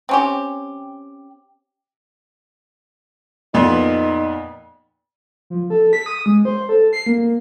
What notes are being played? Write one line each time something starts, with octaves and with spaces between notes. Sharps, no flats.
C4 C#4 G4
F2 A#2 B3 D#4
F3
A4
B6
D#6
G#3
C5
A4
C7
A#3